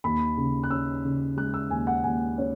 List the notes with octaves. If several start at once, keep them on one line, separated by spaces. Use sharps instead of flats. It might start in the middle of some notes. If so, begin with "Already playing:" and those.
D#2 B5
C#3
F#6
C#4 E6
C#3
G#3 F#6
E6
D#2 G#5
F#5
D#2 G#5
C#4